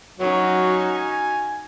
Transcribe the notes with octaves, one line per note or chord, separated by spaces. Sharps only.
F#3 C#4 D#4 F#4
G#5